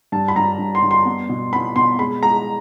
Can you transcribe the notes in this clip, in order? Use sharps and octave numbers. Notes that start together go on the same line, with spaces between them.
G2 A5
B5
G2 A#5
G2
C6
G2
C6
B3
B2
B3 B5
B2 C6
G#3 B5
G#3 A#5